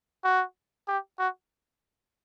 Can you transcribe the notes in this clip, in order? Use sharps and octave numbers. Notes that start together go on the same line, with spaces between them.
F#4
G4
F#4